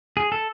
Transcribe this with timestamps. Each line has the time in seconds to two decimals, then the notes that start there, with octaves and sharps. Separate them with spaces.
0.17 G#4
0.32 A4